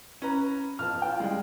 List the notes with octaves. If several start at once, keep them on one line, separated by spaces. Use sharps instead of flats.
C#4 B4 A#5
F2 B3 A5 F6
F4 G5
G3 G#3